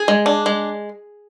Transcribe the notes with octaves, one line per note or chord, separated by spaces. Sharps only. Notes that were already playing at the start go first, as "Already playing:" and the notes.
Already playing: G#4
G#3
D4
G#3